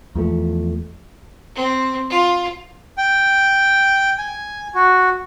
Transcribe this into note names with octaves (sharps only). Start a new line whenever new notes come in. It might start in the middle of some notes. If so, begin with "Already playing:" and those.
E2 F3 G3 A3
C4
F4
G5
G#5
F#4